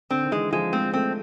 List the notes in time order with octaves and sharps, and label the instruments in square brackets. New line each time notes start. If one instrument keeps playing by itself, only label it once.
[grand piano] D3 [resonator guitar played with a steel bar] C4
[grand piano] D#3
[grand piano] E3 [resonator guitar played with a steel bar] G#3
[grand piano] F3 [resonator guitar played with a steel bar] G#3
[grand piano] G#3 [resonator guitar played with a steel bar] C4
[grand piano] A3 [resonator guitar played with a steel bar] C4